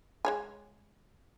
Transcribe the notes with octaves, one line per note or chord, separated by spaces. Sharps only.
G#3 C#5 G#5